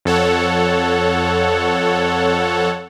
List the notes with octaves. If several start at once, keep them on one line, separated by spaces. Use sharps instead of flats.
F2 A4 C#5 F#5